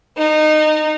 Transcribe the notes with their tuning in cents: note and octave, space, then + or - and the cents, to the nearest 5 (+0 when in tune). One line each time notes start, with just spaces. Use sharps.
D#4 -20